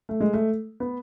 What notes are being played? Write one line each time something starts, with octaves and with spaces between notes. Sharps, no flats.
A3
G#3
A3
B3